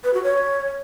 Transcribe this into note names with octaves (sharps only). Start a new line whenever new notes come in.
B4
F#4
C#5